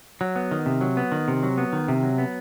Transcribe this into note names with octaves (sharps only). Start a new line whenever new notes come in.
F#3
B3
D#3
C3
F#3
B3
D#3
C3
F#3
B3
D#3
C3
F#3
B3